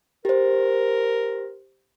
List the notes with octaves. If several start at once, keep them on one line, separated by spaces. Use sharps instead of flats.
G4 A#4 C5